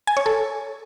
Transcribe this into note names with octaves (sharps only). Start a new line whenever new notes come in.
G#5
C#5
A4